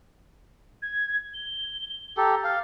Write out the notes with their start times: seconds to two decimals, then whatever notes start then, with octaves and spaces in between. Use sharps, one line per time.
0.82 G#6
1.34 G7
2.17 G4 A4 A#5
2.44 F5 A6